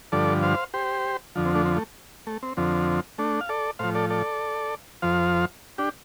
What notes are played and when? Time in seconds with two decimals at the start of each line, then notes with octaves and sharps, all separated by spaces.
0.12 G2 D3 F3 A4 D5
0.42 C5 F5
0.74 G4 C5
1.35 F2 D3 F3
1.45 C4
1.55 A3 D4
1.65 C4
1.76 A3
2.27 A3
2.43 C4
2.57 F2 D3 F3 C4
3.18 A3 D4
3.41 F5
3.49 A4 D5
3.79 A2 F3 C5 F5
3.95 A4 D5
4.10 A4 D5
5.02 F2 F3 C5 F5
5.78 D4 G4